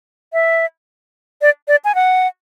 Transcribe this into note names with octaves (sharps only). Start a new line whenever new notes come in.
E5
D5
D5
G#5
F#5